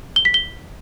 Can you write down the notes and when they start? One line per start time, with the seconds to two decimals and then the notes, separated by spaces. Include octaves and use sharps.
0.16 G7
0.25 B6
0.34 G7